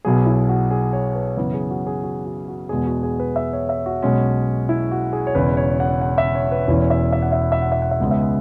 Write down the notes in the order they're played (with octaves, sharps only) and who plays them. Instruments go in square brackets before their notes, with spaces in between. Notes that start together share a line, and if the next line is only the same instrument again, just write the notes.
[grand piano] B1 B2 F#3 B3 G#4
E4
F#4
G#4
C#5
B4
F#2 C#3 E3 B3 B4
G#4
F#4
G#4
F#4
F#4
F#4
E2 B2 G#3 B3 G#4
F#4
G#4
B4
E5
C#5
E5
F#4
B1 B2 G#3 C#4
E4
F#4
G#4
C#5
E1 E2 C#3 B4
C#5
F#5
F#5
E5
C#5
B4
E1 E2 E3 C#4 B4
E5
E5
F#5
E5
F#5
E5
F#5
E5
F#5
E5
C#2 C#3 G#3 B3 F#5
E5
F#5